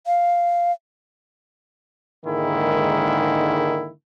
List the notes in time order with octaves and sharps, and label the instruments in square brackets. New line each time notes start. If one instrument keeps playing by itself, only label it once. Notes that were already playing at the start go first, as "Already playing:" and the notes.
[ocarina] F5
[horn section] G#2 D3 D#3 G#3 A#3 E4